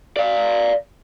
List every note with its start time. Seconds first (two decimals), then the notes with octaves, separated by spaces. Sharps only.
0.17 D5 F5